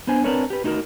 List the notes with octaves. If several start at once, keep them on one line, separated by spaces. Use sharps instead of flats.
B3 D4 C5 G#5
C4 D4 A#4 B4 C#5
G4 B4
A3 D#4 F#4 G#4 A#4